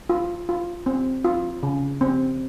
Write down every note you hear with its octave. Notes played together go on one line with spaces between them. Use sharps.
F4
F4
C4
F4
C#3
C4